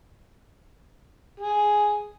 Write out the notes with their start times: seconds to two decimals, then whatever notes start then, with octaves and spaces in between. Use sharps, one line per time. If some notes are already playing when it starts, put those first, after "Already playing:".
1.40 G#4